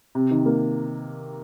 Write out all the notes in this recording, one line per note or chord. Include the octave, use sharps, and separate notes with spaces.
C3
D#3
A#3